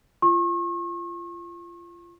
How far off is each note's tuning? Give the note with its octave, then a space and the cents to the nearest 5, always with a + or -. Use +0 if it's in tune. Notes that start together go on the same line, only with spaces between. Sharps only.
F4 -25 C#6 -40